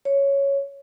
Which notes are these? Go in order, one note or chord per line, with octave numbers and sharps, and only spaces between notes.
C#5